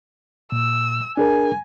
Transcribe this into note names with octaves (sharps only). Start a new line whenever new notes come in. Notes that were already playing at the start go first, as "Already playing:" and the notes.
A#2 E6
D4 G#4 A#4 G#5